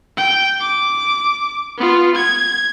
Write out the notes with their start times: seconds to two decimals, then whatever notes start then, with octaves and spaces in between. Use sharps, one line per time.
0.17 G5
0.60 D6
1.78 B3 F4
2.16 G#6